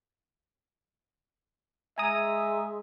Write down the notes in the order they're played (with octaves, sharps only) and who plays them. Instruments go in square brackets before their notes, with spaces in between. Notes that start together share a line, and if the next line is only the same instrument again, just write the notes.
[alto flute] G#3 [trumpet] E5 [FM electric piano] G#5 A#5 D#6